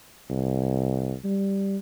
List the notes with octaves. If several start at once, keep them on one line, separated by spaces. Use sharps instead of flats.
C2
G3